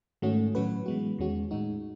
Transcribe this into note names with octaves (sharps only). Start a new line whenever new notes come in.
G#2 D#3 A3 C#4 F#4
A2 F#3 C#4 F#4 B4
E3 G#3 B3 F#4
E2 D#3 G#3 C#4 F#4
A2 G#3 D#4 F#4